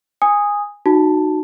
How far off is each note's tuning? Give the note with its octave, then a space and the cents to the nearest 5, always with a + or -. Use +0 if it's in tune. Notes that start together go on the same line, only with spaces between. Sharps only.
G#5 -15 D#6 +0
D#4 -20 F#4 +0 A5 +0